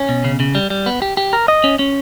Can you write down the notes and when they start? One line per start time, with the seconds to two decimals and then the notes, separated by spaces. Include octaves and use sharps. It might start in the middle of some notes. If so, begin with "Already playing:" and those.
Already playing: C#4
0.09 B2
0.24 C#3
0.40 C#3
0.55 G3
0.70 G3
0.86 B3
1.02 G4
1.17 G4
1.33 A#4
1.48 D#5
1.64 C#4
1.79 C#4